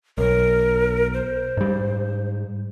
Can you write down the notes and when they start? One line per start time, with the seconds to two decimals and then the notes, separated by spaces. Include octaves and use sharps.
0.18 B1 A#4
1.14 C5
1.57 G#2 G3